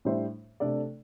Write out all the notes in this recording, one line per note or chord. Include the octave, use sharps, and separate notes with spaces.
A2 G3 D4 C5 E5
C3 A3 D4 A4 D5